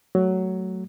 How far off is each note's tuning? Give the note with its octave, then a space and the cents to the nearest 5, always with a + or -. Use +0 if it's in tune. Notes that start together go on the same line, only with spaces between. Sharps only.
F#3 +10 A3 +0